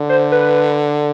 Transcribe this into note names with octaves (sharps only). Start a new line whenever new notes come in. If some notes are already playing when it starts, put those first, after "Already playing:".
Already playing: D3
C5
B4